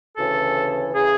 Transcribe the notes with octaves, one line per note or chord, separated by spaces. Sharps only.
D2 C#3 E3 A4
C#3 E3 G#4